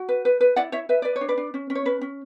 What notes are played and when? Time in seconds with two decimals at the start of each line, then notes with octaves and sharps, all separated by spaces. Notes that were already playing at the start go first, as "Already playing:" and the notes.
Already playing: F#4
0.09 B4
0.25 B4
0.41 B4
0.56 E4 D5 F#5
0.72 E4 C#5 E5
0.89 B4 E5
1.02 B4 D5
1.16 C#5
1.21 D4
1.28 B4 D5
1.37 D4
1.54 C#4
1.70 C#4
1.75 C#5
1.86 C#4 B4
2.01 C#4